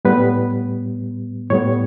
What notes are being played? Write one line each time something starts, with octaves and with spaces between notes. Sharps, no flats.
A2 G3 B3 B4
A2 G3 B3 C#5